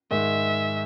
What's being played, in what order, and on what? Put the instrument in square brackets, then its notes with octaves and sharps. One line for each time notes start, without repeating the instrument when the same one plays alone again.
[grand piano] G#2 D#3 G#3 [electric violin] E5